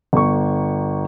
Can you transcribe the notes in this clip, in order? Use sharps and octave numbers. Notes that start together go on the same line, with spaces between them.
G1 C#6